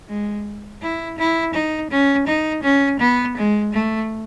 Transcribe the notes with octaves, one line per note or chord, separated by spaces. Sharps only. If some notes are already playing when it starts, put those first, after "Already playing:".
G#3
E4
E4
D#4
C#4
D#4
C#4
B3
G#3
A3